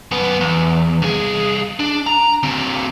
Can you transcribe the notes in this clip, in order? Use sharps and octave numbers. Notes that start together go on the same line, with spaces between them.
F#2 B3
E2
C2 G#4
D4
A#5
D3 C4